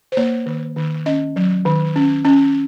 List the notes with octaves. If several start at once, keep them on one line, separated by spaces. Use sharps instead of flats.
C5
A#3 C#5
D#3
D#3
C#4 D#5
F#3
D#3
C#4
C#4